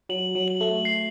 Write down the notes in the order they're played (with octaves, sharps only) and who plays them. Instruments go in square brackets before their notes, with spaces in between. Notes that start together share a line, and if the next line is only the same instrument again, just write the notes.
[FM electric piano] F#3 [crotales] F#7
[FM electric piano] F#3
[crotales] F#7
[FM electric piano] A3
[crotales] C7